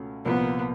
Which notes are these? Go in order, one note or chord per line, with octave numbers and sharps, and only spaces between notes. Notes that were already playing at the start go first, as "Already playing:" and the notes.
Already playing: C#2 B2 A3 C#4
C2 A#2 F3 A#3 B3